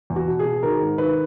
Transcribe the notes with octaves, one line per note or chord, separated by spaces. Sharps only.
E2
F#4
B2
G#4
B2
D#3 A#4
G#2
D#3 B4